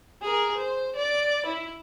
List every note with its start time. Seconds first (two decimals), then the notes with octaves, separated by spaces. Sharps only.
0.22 G#4 A#4
0.57 C5
0.96 D5
1.46 E4